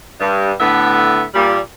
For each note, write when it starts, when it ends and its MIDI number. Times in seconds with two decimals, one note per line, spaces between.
0.20 0.52 43
0.60 1.23 45
0.60 1.23 50
0.60 1.23 59
0.60 1.23 71
0.60 1.23 76
1.33 1.59 46
1.33 1.59 55